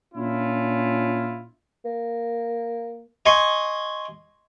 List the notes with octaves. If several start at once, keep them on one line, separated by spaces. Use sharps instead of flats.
A#2 C#4 D4 E4 F4
A#3
D#5 G#5 C6 C#6